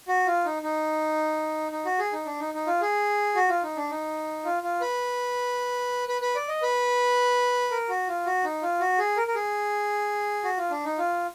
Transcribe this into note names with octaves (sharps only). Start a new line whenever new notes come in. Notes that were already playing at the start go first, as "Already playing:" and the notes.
F#4
F4
D#4
D#4
D#4
F#4
G#4
D#4
D4
D#4
D#4
F4
G#4
F#4
F4
D#4
D4
D#4
F4
F4
B4
B4
B4
D5
D#5
B4
A#4
F#4
F4
F#4
D#4
F4
F#4
G#4
A#4
A#4
G#4
F#4
F4
D4
D#4
F4